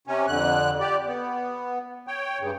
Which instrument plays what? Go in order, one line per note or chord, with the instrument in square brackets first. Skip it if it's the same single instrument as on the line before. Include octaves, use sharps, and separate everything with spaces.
[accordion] C3 C#4
F2 D3 F#6
G4 D5
B3
C#5 G5
G2 C#3